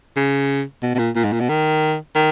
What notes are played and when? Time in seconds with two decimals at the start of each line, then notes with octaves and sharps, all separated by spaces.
0.16 C#3
0.82 B2
0.95 B2
0.99 A#2
1.15 A#2
1.24 G#2
1.32 A#2
1.40 B2
1.49 D#3
2.16 D#3